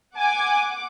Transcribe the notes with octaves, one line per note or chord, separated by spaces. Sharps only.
F#5 G#5 D6